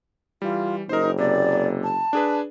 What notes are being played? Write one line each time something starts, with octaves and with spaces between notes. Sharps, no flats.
E3 G3 F4
F#1 D#4 A#4 C5
C3 A#3 D5
A5
D4 G#4 B4